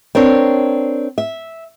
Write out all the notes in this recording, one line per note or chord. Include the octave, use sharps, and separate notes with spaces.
C4 D4 A#4 C#5
E5